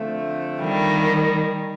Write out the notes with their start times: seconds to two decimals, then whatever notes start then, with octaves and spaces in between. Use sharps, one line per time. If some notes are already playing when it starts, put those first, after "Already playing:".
Already playing: D3 F3 A3 C4
0.63 D#3 G3